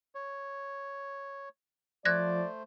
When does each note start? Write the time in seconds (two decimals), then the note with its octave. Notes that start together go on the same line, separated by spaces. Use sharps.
0.15 C#5
2.05 F3 A3 C5 D5 F#6 G#6 A#6